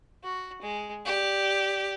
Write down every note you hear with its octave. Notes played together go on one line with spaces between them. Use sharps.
F#4
G#3
G4 D5